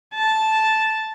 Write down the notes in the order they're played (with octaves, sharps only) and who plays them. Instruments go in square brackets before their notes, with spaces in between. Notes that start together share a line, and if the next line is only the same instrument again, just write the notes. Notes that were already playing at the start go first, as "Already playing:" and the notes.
[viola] A5